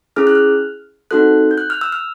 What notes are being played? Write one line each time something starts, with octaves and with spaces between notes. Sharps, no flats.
C#4 E4 G#4 F6
F#6
F6
C4 D#4 F#4 A4 F#6
G6
F#6
F6
E6
F6